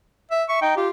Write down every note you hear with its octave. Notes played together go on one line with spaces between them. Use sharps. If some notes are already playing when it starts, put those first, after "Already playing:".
E5
E5 C#6
D#4 G5
F4 G4